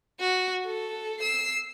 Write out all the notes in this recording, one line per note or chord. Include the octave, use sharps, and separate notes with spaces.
F#4
A4
E6 C7